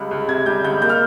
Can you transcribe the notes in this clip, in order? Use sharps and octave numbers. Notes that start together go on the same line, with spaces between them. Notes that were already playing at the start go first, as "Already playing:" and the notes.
Already playing: C#2 G3
C#2
C3 G#6
G3 G6
C#2 G6
A#3 G6
F6